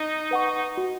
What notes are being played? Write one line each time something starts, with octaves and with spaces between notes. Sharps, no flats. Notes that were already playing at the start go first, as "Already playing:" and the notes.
Already playing: D#4
B4 F#5 C#6
F#4